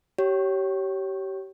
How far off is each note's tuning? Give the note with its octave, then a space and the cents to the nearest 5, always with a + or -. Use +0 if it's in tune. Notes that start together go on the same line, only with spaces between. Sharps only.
G4 -25 C#5 +0